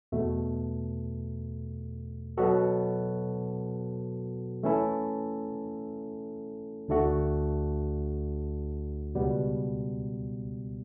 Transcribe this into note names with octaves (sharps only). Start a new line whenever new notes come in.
E2 B2 A3
B2 F#3 B3 F#4 A4
E3 A3 C#4 E4 A4
D2 D3 A3 D4 F#4
C#2 B2 G3 B3